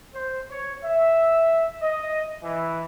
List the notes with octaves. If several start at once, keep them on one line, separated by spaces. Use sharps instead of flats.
C5
C#5
E5
D#5
E3